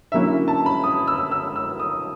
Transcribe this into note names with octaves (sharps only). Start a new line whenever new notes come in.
D3 F#3 A#3 C#4 E4 E5
A5
B5
D#6
E6
E6
E6
D#6